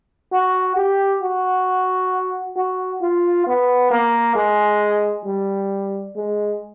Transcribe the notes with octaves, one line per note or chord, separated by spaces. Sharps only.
F#4
G4
F#4
F#4
F4
B3
A#3
G#3
G3
G#3